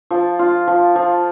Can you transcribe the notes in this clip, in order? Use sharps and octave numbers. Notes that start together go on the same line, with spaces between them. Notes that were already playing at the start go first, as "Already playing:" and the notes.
F3
F4
F3
F3